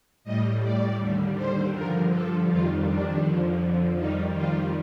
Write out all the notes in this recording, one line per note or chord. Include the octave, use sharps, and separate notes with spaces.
A2 G3 D#5
D5
D#2 D3 G3
C5
G2 D3 F3 A#4
A4
F2 D#3 G3 F4
D4
F2 D3 F3
F2 D#3 G3 D#4
F4